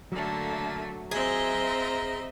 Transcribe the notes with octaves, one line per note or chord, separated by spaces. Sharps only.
D3 F#3 A3 A#3
C4 F4 G#4 D#5 E5 A#5